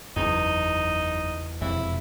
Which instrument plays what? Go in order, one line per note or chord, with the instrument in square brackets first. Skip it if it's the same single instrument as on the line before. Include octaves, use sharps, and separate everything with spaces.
[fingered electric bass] F#1 [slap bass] E2 [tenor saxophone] D#4
[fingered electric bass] E1 F2 C3 [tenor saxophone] E4